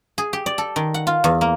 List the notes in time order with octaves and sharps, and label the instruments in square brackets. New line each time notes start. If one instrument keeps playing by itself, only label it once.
[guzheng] G#4
G4
D5
A4
D#3
F#5
F4
E2
A#3